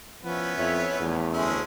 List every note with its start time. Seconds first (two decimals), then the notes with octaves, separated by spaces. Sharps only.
0.24 F3 B3 C#4 E4
0.58 F2 C#5 E5
1.00 E2 A3
1.33 D2 G#3 A3 C#4 E4